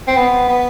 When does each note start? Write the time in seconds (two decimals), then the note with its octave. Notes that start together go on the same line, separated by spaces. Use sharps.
0.08 C4
0.17 B3
0.49 B3